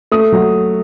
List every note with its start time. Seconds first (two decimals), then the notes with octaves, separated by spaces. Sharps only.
0.12 A3 D#6
0.32 F#3